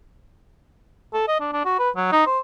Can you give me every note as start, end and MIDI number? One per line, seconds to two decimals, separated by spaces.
1.14 1.23 69
1.28 1.40 75
1.40 1.50 62
1.53 1.62 62
1.65 1.78 66
1.79 1.90 71
1.97 2.10 54
2.12 2.23 63
2.27 2.39 72